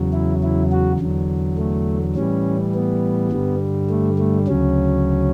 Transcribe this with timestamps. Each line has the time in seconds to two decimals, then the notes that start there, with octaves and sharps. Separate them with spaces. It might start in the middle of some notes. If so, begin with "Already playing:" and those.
Already playing: E2 C#3 F#3
0.13 E4
0.43 E4
0.72 F#4
1.00 E2 D3 F#3
1.58 A3
2.16 A2 E3 G3 C#4
2.75 B3
3.32 G2 D3 G3
3.90 A3
4.18 A3
4.47 D2 C#3 F#3 C#4